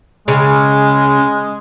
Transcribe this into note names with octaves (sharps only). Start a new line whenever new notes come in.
C#3 G#3